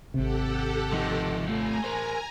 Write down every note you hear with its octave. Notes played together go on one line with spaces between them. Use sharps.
G#1 C3 G4 A4 F#5
F3 D#4
A3 F4 G#5 A#5
A#4 C5